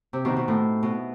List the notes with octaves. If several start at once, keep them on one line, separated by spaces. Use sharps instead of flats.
C3
B2 D#3
B2
A2
B2